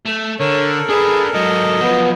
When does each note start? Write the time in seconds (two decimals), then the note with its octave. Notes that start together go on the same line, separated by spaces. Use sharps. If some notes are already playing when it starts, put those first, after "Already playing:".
0.05 A3
0.40 D3 A4 A#4 C#5
0.89 D4 G#4 B4
1.34 G#2 F#3 D#5
1.81 F3 F#3 B3